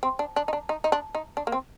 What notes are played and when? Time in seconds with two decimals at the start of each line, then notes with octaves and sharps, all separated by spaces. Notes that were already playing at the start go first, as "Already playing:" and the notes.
0.03 C4
0.19 D4
0.36 D4
0.48 D#4
0.53 D4
0.69 D#4
0.84 D#4
0.92 D4
1.15 D#4
1.37 D4
1.47 A#3
1.52 C4